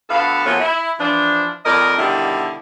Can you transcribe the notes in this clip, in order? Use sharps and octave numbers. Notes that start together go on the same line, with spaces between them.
D2 A2 B3 A4 F5
A#2 F3 F#3 A3 B3 F#4
E4
E3 F3 D4
F2 A2 A#4 D5 D#5
B2 D3 D#3 G3 E4